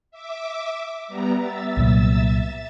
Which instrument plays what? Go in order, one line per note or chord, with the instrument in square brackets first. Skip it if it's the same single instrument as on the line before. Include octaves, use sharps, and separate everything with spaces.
[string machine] E5 D6
G3 B3 A#5
E5 E6 A6
[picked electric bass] C2 A#2 F#3